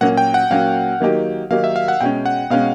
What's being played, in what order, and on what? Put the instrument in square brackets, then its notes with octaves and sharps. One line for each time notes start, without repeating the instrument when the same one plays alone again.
[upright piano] A#2 F#3 A#3 C#4 F#4 [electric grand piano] F#5
[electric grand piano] G5
F#5
[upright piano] A#2 F#3 A#3 C#4 F#4 [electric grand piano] F5
[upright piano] D#3 F#3 A#3 D#4 G4
[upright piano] D#3 F#3 A#3 D#4 G4 [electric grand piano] F5
[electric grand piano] E5
F5
F#5
[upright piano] B2 G#3 C#4 [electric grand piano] G5
[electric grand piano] F#5
[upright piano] B2 G#3 C#4 [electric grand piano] F5